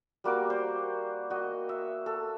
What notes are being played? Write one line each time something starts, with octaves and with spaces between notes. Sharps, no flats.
G3 A#3 F#4 D6
C5
F#4 D#5
E5
A4